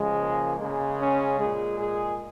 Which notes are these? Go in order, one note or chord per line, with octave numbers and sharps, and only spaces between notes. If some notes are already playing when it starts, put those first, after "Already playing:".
Already playing: C#3 F3 G#3
A#3
C#3 G#3
C#4
A#2 G#3 G#4
G#4